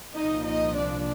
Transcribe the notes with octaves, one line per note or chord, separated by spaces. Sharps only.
C2 A#2 F3 D#4 D#5
D#4 D#5
D4 D5